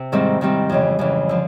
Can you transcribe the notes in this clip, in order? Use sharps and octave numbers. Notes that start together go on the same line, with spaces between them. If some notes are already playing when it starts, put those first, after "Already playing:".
Already playing: C3
G#2 D#3 G3 C4 E4
G#2 D#3 G3 C4 E4
F2 C#3 E3
F2 C#3 E3
D3 F3